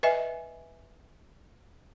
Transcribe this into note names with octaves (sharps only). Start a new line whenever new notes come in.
B4 D#5 E5 G#5